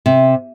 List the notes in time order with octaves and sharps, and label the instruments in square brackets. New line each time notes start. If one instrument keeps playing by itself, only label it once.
[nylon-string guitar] C3